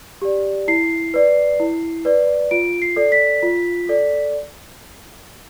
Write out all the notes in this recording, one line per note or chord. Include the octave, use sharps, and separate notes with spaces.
G4 D5
E4 C7
B4 D5
E4
B4 D5
F4 D7
C7
A4 D5
B6
F4
A4 D5